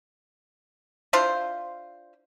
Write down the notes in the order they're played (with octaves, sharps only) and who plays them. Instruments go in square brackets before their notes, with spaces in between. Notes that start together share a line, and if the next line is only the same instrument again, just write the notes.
[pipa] D4 E4 F4 C5